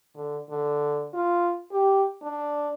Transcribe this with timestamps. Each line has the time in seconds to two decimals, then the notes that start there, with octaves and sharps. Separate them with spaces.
0.16 D3
0.50 D3
1.14 F4
1.72 G4
2.22 D4